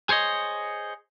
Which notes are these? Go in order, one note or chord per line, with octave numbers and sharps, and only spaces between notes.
G#4 C5 C#5 D#5